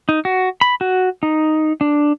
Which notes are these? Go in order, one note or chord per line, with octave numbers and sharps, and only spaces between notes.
D#4
F#4
B5
F#4
D#4
D4